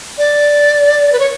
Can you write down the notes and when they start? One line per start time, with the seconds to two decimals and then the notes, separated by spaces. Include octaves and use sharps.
0.18 D5
1.12 B4
1.19 C#5